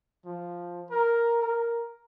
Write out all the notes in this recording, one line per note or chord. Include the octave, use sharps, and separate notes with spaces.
F3
A#4
A#4